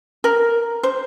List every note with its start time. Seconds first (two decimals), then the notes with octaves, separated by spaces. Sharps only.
0.24 A#4
0.83 C5